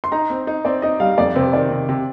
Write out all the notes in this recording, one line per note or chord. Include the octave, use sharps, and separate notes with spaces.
C6
D#4 A#5
C4
D#4
C4 D5
D#4 D#5
G3 F5
F2 D5
C3 C5
D#3 D5
C3
C3